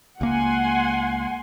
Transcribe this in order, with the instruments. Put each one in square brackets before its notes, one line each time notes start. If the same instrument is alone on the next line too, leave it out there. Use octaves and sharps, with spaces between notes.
[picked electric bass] C#2 A#3 [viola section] F#5 G#5 C6